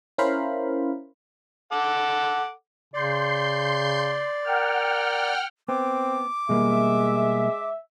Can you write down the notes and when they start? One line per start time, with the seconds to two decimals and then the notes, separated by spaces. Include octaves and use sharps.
0.18 C#4 E4 A#4 C5 F5 B5
1.72 A4 F#5 D6
2.94 C#3 D5 C6 G6 C7
4.44 A#4 F#5 G5 F6
5.68 B3 C4 D6
6.49 B2 G3 G#3 A#3 E5